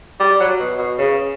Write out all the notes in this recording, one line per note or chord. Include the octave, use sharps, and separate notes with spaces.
G3
F#3
B2
B2
C#3